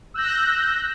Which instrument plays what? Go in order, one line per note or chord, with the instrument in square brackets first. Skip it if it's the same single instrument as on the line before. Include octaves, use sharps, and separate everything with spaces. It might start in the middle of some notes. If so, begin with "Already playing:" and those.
[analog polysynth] E6 F#6 G6 A#6